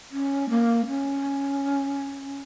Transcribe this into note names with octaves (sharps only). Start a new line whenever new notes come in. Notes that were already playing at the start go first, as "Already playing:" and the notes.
C#4
A#3
C#4